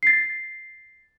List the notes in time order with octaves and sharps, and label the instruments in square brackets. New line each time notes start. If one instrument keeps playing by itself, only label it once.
[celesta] A6 C7